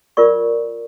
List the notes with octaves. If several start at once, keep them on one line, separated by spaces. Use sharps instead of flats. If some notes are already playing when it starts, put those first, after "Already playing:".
F4 A#4 D5 C#6